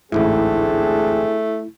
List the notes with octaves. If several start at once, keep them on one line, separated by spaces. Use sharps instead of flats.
A1 D2 G#2 A3 C4 D4 E4 G#4